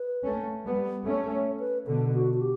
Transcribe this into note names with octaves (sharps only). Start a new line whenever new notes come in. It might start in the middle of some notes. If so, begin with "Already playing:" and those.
Already playing: B4
A3 C#4
G3 B3
A3 C#4 A4
C#5
B4
B2 D3 A4
F#4
F#4
G4